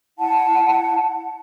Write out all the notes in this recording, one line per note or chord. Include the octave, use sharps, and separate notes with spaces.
E4 F#5 A5